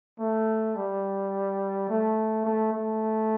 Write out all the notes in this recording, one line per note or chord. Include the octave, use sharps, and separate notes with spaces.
A3
G3
A3
A3
A3